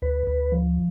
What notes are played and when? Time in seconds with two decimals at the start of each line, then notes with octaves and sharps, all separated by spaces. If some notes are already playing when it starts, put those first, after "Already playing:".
0.02 D2 B4
0.27 D2
0.52 F3